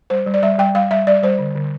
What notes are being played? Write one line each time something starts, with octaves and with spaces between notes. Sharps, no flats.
G3 C5
G3
D5
G3 E5
G3 G5
G3 F5
G3 E5
G3 D5
G3 C5
D3
D3